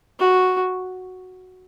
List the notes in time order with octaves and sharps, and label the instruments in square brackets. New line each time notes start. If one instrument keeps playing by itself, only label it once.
[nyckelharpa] F#4